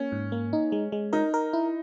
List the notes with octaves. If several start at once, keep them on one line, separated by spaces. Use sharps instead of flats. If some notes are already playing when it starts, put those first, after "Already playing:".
Already playing: A#3 C#4
G#2
A#3
D#4
G#3
G#3
D#4 A#4
A#4
E4